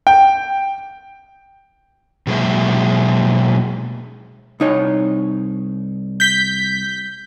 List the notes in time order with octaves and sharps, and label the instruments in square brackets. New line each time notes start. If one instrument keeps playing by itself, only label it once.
[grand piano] G5
[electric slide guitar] B2 F#3 G#3 A#3 C5 E5
[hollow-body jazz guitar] C2 D#4 C#5
[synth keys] G6 B6